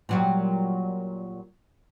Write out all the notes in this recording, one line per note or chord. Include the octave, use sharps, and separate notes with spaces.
A#2 F#3 G3